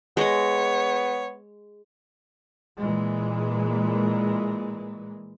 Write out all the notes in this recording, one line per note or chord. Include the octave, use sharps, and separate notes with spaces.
G#3 B3 C#5 D#5
A#2 E3 G#3